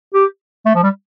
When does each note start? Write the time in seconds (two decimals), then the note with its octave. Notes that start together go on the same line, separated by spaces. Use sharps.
0.14 G4
0.66 A3
0.75 F3
0.83 G3